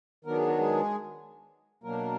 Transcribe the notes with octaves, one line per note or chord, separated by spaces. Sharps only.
D#3 F#3 B3 D4 A#4
G#4
F#4
G#3 G#4
B2 F#3 A#3 D4 A#4